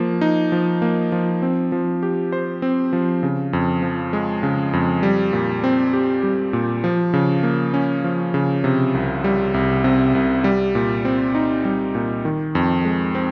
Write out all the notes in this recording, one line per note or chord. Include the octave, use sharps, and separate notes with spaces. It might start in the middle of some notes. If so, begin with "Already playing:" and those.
Already playing: F3 A#3
D#4
F3
A#3
F3
C4
F3
G4
C5
C4
F3
C#3
F2
F3
G#3
C#3
F2
G3
A#2
C4
G4
G3
A#2
F3
C#3
A#3
C#4
F3
C#3
C3
C2
G3
C2
C3
C2
G3
A#2
C4
D#4
G3
A#2
D#3
F2
G#3
C4